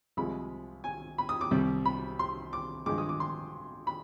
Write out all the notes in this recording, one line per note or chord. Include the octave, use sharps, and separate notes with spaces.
C2 C3 F3 G#3 B5
G#5
B5
D#6
D6
C2 C3 G3
B5
C6
D6
G2 F3 G#3 D6
D#6
D6
C6
B5